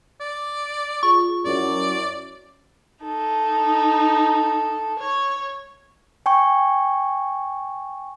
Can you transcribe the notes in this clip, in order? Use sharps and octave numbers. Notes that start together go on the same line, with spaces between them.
D5
F4 G#4 C#6
F#2 E4 C#5 D5
D#4 A4
C#5
G5 G#5 C#6